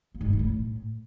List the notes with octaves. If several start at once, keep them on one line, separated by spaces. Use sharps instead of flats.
A#3
G#2
F3
E3
A2